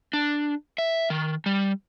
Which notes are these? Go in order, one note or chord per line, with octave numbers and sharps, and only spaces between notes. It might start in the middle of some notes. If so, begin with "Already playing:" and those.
D4
E5
D#3
G3